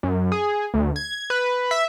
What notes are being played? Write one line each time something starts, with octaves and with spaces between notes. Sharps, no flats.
F#2
G#4
D2
G#6
B4
E5